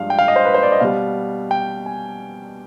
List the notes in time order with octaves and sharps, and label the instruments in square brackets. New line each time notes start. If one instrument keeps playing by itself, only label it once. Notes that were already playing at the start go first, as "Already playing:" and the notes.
Already playing: [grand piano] G2 F3 G#3 F5
G5
F5
D#5
C5
B4
C5
D5
D#5
B2 G3 F5
G5
G#5